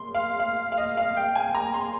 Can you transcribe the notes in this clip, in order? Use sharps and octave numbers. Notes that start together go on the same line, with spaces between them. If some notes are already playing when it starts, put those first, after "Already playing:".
Already playing: C6
F5
F5
F5
D#5
F5
G5
G#5
A#5
C6